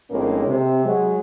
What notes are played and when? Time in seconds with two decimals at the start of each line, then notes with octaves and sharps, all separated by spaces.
0.11 A#1 A2 G#3 A#3 C4 C#4
0.47 C3
0.84 F#3 G#3